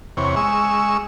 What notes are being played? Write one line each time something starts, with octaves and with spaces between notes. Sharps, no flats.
E2 C3 C#5
G#3 C#6 E6